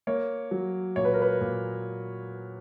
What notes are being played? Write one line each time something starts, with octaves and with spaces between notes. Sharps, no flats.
A#3 C#5
F#3
A#2 C#5
B4
A#4
B4
A#2